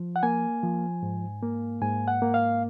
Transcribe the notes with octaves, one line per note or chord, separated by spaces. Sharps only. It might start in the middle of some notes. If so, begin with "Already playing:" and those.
Already playing: F3
F#5
A#3 G#5
F3
G#2
A#3
G#2 G#5
F#5
A#3
F5